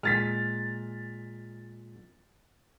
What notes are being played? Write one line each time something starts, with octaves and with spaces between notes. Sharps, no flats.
A#2 G#3 F6 A6 B6